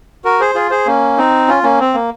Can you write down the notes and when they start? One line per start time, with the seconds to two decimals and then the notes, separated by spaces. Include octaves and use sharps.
0.25 F#4 A#4
0.40 G#4 C5
0.55 F4 G#4
0.70 G#4 C5
0.86 A#3 C#4
1.18 C4 D#4
1.48 C#4 F4
1.63 A#3 C#4
1.80 C4
1.94 A#3